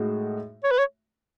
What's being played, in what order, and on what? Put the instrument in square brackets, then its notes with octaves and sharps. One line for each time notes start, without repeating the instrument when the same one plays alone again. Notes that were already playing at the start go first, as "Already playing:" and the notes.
Already playing: [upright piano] A2 G#3 D#4 F#4
[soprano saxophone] C#5
B4
C#5